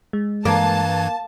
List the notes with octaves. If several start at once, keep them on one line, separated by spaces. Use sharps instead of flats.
G#3
G2 E3 A#3 A5 G#6